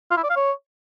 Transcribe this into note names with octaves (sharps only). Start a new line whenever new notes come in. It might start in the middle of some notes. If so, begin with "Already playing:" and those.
F4
E4
D5
F5
C#5